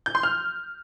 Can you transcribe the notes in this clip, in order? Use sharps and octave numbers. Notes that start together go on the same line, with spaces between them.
G6
C6
F6